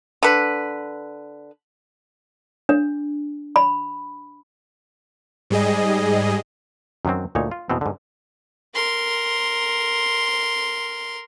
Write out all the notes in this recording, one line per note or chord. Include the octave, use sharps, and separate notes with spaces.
D3 B4
D4
B5
G#2 G3 G#4 D#5
F#2 D#3 F#3 C4
D2 A#2 D#4 C#5
F4
E2 B2 B3 C4
G#2 D3
A#4 C6